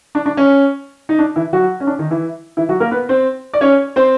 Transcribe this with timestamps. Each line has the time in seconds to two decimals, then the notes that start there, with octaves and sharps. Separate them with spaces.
0.15 D4
0.26 D4
0.37 C#4
1.09 D#4
1.19 D4
1.36 E3 E4
1.53 F#3 F#4
1.80 C#4
1.87 D4
1.99 D#3 D#4
2.10 E3 E4
2.57 E3 E4
2.69 F#3 F#4
2.80 A#3 A#4
2.91 B3 B4
3.09 C4 C5
3.53 D5
3.61 C#4 C#5
3.96 C4 C5